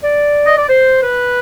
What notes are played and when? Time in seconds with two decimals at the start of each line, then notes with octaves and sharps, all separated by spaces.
0.03 D5
0.46 D#5
0.57 D5
0.69 C5
1.03 B4